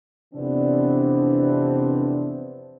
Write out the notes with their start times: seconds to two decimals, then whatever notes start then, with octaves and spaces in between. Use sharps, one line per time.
0.34 F2 C3 E3 B3 C4 D4